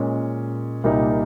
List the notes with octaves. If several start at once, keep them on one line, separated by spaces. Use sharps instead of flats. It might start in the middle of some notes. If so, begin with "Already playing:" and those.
Already playing: A#2 G#3 C#4
C2 A#2 G3 A#3 D#4